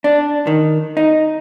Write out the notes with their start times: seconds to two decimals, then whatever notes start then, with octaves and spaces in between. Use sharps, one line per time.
0.04 D4
0.47 D#3
0.97 D#4